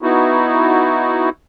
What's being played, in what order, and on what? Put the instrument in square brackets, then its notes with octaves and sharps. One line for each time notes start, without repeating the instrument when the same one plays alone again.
[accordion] B3 D#4 E4 F#4